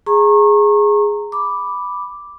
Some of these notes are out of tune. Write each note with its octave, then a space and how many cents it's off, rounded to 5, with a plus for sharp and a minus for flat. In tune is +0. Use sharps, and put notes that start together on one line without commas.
G#4 +0 A#5 -15 C#6 -35
B5 +0 D6 +0